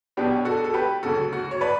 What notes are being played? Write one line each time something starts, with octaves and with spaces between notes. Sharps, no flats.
B1 B2 F#3 B3 D4 G4
F#4 A4
A4
G4 B4
D2 C#3 F#3 F#4 A4
F#4
C#5
B4 D5